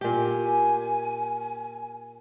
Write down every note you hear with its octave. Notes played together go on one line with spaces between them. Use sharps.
A#2 G4 G#5